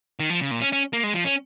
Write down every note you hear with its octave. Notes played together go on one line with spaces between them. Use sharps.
D#3
F3
C#3
A#2
C#4
C#4
A#3
G#3
F3
C#4